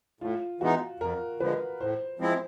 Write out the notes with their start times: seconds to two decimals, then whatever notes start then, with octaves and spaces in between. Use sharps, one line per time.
0.21 A2 F4
0.61 E3 G#3 B3 D#4 F#4
1.00 F2 A#4
1.40 D3 F3 G#3 B4
1.80 A2 C5
2.19 F3 G#3 C4 E4 C5